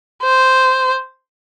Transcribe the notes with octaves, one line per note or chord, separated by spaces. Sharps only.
C5